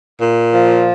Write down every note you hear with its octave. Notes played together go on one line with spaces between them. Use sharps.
A#2
F3